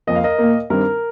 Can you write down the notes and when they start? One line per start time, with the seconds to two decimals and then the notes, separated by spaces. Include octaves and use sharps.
0.07 F2 F3 A#3 D#5
0.16 F5
0.24 A#4 D#5
0.38 A#2 A#3
0.70 G2 D#3 G3 C4 A#4